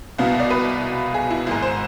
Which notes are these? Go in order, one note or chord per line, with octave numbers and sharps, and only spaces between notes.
C2 B2 B3 F5
D5
B4
G#4
E4
G#1 G#2 G#3 E4
C5